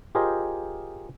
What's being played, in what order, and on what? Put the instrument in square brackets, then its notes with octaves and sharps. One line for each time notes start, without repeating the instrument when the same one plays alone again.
[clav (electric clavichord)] F4 G4 G#4 A#4 C5 D#5